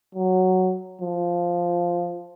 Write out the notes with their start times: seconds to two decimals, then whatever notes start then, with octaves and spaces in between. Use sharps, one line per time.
0.15 F#3
1.01 F3